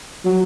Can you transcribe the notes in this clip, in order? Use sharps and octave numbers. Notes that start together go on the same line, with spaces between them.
F#3